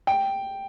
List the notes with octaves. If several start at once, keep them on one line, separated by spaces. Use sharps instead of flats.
G5